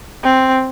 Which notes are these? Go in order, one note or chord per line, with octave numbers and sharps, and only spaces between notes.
C4